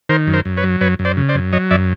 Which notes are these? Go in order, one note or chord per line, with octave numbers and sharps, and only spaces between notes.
D#3 A#4 C5
F#2
A#4 C5
F#2
B4 C#5
F#3
F#2 B4 C#5
F#2
C5 D5
C#3
C5 D5
F#2
F#3 C#5 D#5
F#2 D5 E5